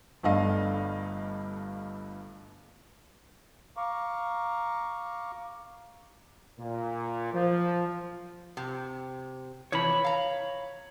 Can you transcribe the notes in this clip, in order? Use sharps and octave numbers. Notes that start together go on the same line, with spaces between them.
G1 G2 A3 D4 D#5 F5
F5 A#5 C#6 D6
A#2
F3
C3
C3 E3 F3 C#5 B5
F5 A#5